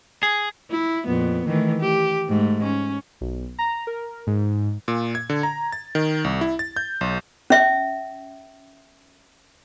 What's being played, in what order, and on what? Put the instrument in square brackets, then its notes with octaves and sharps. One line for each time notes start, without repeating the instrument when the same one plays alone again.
[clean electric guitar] G#4
[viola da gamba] E4
F2 A#2 B3
D#3 E3 A3
G4
G#2 A3
C#4
[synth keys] B1
A#5
A#4
G#2
[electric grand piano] A#2
G#6
D3
A#5
A6
D#3
C2
E4
A6
G6
B1
[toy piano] C#4 E5